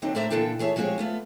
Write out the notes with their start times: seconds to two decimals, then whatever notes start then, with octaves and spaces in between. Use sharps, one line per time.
0.02 D#2 D3 F#3 C4 D4 D#4
0.15 A2 D4 C5 D5 E5 A#5
0.30 A#2 D3 E3 D4 A4 G5
0.59 E3 G#4 C#5 E5 A5
0.76 F3 G#3 C4 G4 G#4 C#5
0.98 A3 B3 F4